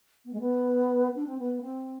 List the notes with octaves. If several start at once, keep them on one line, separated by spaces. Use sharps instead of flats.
B3
G#3
B3
D4
C4
B3
C4